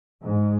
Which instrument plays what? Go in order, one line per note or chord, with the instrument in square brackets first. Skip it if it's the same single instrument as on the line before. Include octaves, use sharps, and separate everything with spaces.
[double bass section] G#2